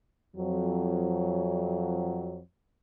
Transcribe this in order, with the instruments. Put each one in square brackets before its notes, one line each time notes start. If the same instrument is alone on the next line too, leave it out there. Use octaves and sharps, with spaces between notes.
[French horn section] F2 F#3